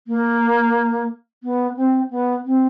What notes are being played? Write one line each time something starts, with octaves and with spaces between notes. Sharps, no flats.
A#3
B3
C4
B3
C4